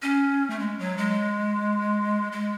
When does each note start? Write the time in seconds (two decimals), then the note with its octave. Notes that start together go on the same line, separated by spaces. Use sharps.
0.02 C#4
0.50 A3
0.59 G#3
0.79 F#3
0.98 G#3
2.32 G#3